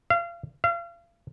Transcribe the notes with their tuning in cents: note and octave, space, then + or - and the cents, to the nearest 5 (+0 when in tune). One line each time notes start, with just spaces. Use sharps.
F5 -30
F5 -35